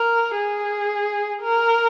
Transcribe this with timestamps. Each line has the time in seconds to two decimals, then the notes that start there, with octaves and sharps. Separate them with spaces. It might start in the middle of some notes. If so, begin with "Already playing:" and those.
Already playing: A#4
0.36 G#4
1.43 A#4